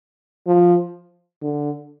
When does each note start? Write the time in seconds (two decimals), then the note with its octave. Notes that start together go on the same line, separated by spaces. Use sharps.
0.47 F3
1.42 D3